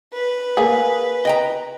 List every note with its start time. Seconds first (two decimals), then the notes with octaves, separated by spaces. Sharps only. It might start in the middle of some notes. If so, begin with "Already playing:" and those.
0.13 B4
0.57 A#3 G#4
1.25 D#5 G5 A#5